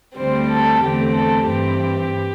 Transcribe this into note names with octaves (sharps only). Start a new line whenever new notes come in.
D2 D3 G3 C4 C5
A4
E2 D3 A3 C4 G4
A4
G2 E3 C4 G4